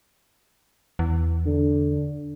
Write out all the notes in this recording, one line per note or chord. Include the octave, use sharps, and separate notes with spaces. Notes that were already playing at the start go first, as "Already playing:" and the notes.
E2
D3